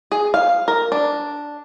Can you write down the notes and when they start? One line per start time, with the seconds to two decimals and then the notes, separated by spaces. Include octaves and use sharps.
0.12 G#4
0.34 F5
0.68 A#4
0.92 D4